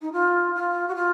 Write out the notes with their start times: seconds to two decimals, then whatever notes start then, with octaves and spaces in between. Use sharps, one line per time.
0.01 D#4
0.12 F4
0.54 F4
0.88 F#4
0.95 F4